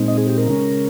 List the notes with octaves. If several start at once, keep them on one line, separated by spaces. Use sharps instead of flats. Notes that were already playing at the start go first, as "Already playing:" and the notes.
Already playing: A#2 G#3 C4 D#4
D#5
G#4
G4
A#4
C#3 G#3 C#4